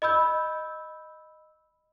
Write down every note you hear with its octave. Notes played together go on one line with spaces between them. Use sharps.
D#5 B5 E6 G6